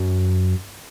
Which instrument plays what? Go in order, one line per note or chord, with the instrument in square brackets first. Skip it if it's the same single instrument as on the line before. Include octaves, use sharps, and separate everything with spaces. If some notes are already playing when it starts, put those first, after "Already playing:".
Already playing: [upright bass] F#2